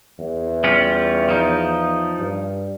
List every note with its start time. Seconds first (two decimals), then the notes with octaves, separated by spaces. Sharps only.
0.19 E2
0.64 G3 C#4 F4
1.29 F3 D#4
2.19 G2